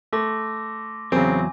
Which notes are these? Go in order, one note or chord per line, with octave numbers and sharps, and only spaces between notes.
A3 C6 D6 A#6
E2 C#3 F#3 C4 G#5